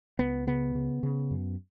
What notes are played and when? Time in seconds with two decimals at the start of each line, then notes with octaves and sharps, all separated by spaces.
0.19 C#2 B3
0.47 C#3 B3
0.75 C#3
1.03 C#3
1.31 F#2